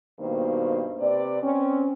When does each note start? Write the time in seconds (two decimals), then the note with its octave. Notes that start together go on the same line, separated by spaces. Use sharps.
0.19 G2 B2 D#3 A#3 C5
0.99 C3 B4 D5
1.42 C4 C#4